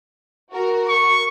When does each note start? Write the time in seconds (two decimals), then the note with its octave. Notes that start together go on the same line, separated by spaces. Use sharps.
0.52 F#4 A#4
0.89 C#6